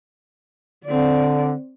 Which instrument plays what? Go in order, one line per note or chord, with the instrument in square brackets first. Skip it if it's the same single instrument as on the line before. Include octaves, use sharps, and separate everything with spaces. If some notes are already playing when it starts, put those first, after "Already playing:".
[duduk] D3 [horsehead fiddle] C4 D5